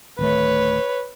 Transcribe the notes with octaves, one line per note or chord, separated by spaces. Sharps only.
D1 D#3 A3 B4 C#5